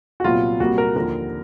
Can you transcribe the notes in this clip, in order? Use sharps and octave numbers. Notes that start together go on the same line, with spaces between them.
F#4
C2 A#2 F#3 B3 F4
C2 A#2 G3 A#3 F#4
A#4
D#2 D3 F3 A#4